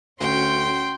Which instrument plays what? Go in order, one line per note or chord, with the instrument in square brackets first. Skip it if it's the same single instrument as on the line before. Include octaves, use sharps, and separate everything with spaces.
[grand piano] D2 [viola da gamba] C#4 F#4 [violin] G5 [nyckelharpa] C6